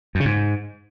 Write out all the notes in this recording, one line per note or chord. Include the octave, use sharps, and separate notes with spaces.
F#2
C#3
G#2